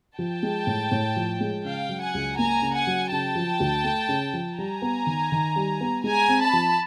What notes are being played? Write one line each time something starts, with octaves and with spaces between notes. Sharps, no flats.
F3 G5 A5
G#3
A2
A2
F3
G#3
C#3 F5 G5
F#3
F#5 G#5
C#2
A#3 G#5 A#5
C#3
F#5 G#5
F#3
C#3 G5 A5
F3
D2
A3
C#3
F3
G3 G#5 A#5
B3
D#3
D#3
G3
B3
G#3 G#5 A#5
C4
A5 B5
F3